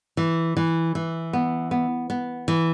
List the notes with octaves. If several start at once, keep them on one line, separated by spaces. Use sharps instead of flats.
E3
E3
E3
B3
B3
B3
E3